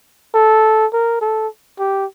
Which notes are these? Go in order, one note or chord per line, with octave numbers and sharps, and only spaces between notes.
A4
A#4
A4
G4